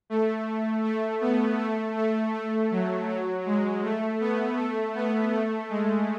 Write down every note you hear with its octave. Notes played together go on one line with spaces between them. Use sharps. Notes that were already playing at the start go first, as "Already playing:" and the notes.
A3
A3
B3
A3
A3
A3
F#3
F#3
G#3
A3
B3
A3
B3
A3
G#3